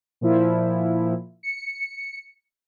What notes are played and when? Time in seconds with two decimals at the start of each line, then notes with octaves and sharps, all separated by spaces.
0.21 A#2 F3 E4
1.43 C#7